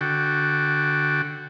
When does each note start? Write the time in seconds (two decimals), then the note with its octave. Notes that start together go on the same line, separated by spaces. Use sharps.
0.01 D3 F#4 G5